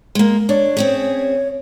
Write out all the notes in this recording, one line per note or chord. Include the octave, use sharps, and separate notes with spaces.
G#3 A#3
D4 C#5
C4 C#4 G#4